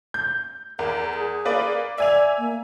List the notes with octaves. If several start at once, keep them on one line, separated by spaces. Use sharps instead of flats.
G6
E2 A#4
G#4
A#3 B4 D5
D5 E5 G#5 F7
A#3